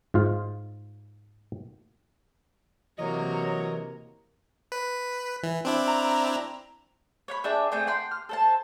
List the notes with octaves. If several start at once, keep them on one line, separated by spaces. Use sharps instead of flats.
G#2 F4 F5
C3 E3 F#3 A#3 A#4 C#5 D#5
B4
E3
C4 D4 E4
A#5
C#5 F#5 B5
D4 G#4 E5 G5
A3 C4 G#4 G5
F#5 G5 C6
F6
A4 C5 A5